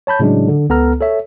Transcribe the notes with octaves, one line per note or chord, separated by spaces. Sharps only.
C#5 A5 B5 G6
A2 C#3 F#3 G#3 D4
D3
C#2 B3 A4 A#5 F6
A4 C#5 E5